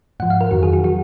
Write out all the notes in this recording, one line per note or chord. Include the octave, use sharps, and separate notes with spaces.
G#2 F3 F#5
F5
A#4
F2 D#3 F#3 F#4
G#4
F#4
D#3 F#3 F#4